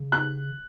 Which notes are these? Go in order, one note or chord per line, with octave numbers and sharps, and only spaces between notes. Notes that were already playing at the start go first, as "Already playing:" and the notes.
Already playing: C#3
F#6